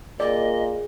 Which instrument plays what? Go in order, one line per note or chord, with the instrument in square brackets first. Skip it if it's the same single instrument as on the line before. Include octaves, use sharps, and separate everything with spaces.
[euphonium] A#2 [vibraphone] G#4 [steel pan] D5 [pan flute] D#5